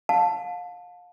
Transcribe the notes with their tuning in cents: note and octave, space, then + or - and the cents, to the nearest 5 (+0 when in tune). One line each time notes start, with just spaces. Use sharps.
F5 +30 A5 +0